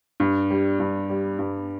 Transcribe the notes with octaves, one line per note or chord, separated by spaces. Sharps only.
G2
G3
G2
G3
G2